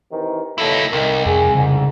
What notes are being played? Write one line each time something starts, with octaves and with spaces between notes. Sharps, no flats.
C3 D#3 E3
B1 A3 A#3 E4
C2 D#4 A#4
F2 G#4
F2 G#2 C#3